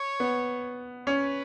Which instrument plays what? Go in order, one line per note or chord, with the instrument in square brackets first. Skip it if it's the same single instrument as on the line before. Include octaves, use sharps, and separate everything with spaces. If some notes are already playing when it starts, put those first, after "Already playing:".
Already playing: [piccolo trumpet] C#5
[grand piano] B3
[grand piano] C#4 [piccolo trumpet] B4